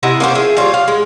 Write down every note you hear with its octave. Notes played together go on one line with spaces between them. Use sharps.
C3 E4 D#5 F#5
A#3 C#4 C5
F3 G#4 E5
G3 F4 F#4 C#5
F5
G#3